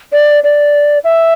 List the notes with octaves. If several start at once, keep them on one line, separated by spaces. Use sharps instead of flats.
D5
D5
E5